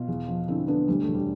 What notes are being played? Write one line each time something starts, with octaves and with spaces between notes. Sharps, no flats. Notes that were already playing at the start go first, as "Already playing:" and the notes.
Already playing: B2 F4
E2
F3
D3 C4 E4
D3 B3 D4
D2 G3
A3
E1
G3